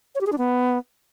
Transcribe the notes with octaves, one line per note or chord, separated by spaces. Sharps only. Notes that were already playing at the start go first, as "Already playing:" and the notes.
C#5
G4
G#4
D4
B3